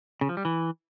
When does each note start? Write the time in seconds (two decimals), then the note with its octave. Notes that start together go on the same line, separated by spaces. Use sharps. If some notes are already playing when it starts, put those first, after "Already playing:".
0.21 C#3
0.29 F3
0.37 G3
0.45 E3